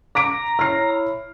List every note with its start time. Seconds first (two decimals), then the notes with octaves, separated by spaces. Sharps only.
0.15 A#5 D6 B6 D7
0.59 E4 C#5 F6 C7